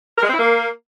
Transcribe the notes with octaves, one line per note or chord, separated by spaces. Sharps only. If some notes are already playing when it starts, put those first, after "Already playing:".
A#4
G#3
C4
E4
A#3